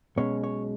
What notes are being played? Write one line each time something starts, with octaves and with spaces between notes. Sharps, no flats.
B1 B2 G#3 C#4 C#5
C#5